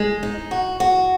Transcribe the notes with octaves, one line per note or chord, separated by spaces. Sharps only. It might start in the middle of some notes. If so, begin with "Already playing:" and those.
Already playing: G#3
D#4
F#4
F#4